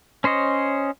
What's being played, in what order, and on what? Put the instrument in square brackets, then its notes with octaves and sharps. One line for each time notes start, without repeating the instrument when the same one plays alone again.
[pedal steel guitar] C#4 C5 C#5 D#5